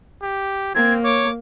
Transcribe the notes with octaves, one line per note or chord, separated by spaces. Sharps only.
G4
A#3 C4 G#6
C#5 D6